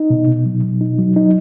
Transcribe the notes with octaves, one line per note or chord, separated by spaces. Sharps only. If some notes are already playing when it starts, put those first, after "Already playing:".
Already playing: D#4
B2
B2
F#3
B2
D#4
F#3
D#4